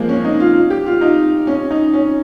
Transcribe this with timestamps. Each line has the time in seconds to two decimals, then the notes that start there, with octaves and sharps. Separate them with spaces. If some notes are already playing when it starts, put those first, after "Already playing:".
Already playing: F3 G#3 A#3
0.09 C#4
0.25 D#4
0.40 F4
0.70 G4
0.86 F4
1.01 D#4
1.47 C#4
1.70 D#4
1.93 C#4